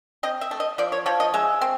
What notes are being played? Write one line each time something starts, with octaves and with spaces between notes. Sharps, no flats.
C4 D#5
E5
A3
D#5
F3 D5
C#5
F3 C#5
D#5
G#3 E5
C4